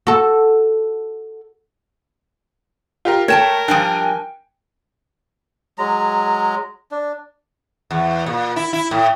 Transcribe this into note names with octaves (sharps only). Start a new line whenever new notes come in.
F#4 A4
F4 G4 A#4
A3 A#4 C#5 G5 A5 E7
F3 G3 D4 G5 G#5 D7
F#3 G#3 A#5
D4
E2
A#2
E4
E4
A2